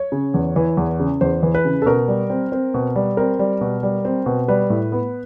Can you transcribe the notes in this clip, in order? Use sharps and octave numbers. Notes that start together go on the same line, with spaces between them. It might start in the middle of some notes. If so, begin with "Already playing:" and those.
Already playing: C#5
C#3
E2
E3
E2
C#3
E2 C5
E3
B4
C#3
A4
B2 A#4
G3
C4
C4
B2
G3
C4 A#4
G3
B2
G3
C4
B2
G3 B4
A2
B3